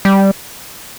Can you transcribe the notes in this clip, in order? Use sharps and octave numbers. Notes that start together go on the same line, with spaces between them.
G3